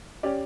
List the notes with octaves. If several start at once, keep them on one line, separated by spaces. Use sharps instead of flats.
C#4 G4 D5